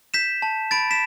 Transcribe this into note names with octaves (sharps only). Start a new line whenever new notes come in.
G6 B6 E7
A5
B5 A6 D7
B6 E7